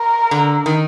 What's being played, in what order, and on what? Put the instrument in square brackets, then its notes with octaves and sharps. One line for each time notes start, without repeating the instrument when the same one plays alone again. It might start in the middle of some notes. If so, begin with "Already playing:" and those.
Already playing: [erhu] A#4
[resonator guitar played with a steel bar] D3
D#3